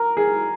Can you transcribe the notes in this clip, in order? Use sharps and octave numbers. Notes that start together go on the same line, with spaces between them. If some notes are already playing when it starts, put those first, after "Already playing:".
Already playing: A#4
G#4